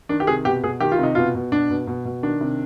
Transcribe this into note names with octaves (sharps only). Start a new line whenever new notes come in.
D#3 D4
G4
C3 G#4
B2 G4
B2 G#4
D#3 G4
F4
C3 D#4
B2 F4
B2
B2 D4
B2
B2
B2
D#3 D4
C3